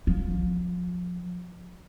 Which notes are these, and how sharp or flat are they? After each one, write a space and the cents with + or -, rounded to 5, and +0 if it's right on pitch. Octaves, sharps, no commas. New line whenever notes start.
F3 +30